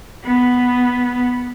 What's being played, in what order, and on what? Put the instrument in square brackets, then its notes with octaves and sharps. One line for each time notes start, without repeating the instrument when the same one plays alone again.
[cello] B3